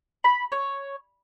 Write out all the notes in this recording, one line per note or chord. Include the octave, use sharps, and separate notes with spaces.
B5
C#5